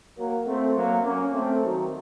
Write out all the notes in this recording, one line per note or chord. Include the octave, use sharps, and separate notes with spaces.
F#3 A#3
A3 C4
F#3 A#3
A#3 C#4
A3 C4
D#3 F#3